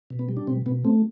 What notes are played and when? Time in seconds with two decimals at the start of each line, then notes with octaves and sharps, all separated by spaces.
0.10 B2
0.19 B3
0.29 G3
0.37 D4
0.47 B2 C4
0.66 B2 B3
0.85 A3 C4